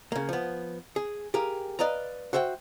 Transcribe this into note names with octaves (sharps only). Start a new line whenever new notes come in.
C#3 A#3
F3 B3
G#4
G4 G#4 A#4 F5
B4 D5 D#5 F5 A#5
F#4 C5 E5 F#5 G5